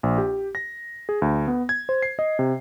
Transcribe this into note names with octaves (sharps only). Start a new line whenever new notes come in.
A#1
G4
A#6
G#4
D2
B3
G#6
C5
C7
D#5
C3